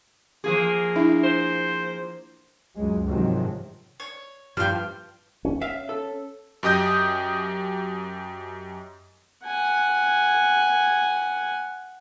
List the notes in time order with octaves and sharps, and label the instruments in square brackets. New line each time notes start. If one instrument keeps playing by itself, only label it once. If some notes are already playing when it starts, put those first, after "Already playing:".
[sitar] F3 A#3 G#4
[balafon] D4 E4 E5
[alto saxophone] C5
[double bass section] C#2 F#2 G#3
G#2 C3 D#3 F3 F#3 G#3
[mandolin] C#5
[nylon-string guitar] G2 F3 G3 [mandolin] G5 F6
[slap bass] C#4
[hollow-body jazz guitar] E5 F5
A4
[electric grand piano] F#2 G4 D#5 D#6 G6
[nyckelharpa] F#5 G#5